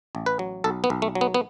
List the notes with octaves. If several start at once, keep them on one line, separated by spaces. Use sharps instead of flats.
A1
B4
F#3
B1 A4
B3
B1
A3
F#3
B3
B3